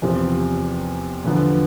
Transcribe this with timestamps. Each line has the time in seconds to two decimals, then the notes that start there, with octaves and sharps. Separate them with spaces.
0.02 E2 C3 F3 C4
1.24 E2 D3 F3 B3